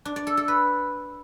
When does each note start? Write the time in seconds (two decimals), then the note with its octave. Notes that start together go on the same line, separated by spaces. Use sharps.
0.05 D4
0.16 D5
0.27 A4
0.37 A4
0.48 B4